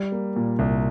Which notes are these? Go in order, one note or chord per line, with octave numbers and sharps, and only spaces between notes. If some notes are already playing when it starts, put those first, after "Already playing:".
Already playing: G3
A#3
A#2
C2